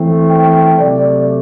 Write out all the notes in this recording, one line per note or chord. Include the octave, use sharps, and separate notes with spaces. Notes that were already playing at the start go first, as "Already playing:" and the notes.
Already playing: E3 A3 C4
G5
C3 F#3 A3 D5